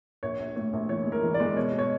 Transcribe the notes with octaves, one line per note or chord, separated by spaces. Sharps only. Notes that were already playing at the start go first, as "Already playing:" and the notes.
A#1 C#5
A#1
A2 C#5
A#1
E3 C#5
G#3
A#4
E3
D5
G#3
B2 C#5
B2
C#5